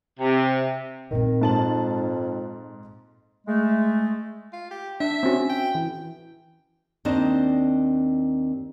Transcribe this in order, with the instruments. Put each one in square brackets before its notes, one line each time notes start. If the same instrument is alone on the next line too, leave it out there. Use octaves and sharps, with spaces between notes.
[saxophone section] C3
[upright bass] A#2 C4 [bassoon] D#3
[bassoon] F2 [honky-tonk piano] G#2 A5 F#7
[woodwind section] G#3 A3
[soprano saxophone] F4
G4
[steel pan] D4 [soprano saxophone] E5
[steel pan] C4 C#4 F#4
[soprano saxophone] G5
[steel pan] E3
[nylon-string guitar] D#2 C4 D4 D#4 D#5